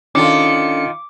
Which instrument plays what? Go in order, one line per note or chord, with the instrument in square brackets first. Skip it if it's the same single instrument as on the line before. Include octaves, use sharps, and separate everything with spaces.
[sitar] D#3 F4 [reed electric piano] C#4 D4 A4 [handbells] D6 [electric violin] C#7